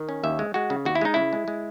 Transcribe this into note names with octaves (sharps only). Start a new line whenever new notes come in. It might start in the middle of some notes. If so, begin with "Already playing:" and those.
Already playing: D#3
C#4
D#2 E5
G#3
G#3 F#4
C#3
D#2 F#4
E4
G#3 D#4
C#3 E4
G#3
G#3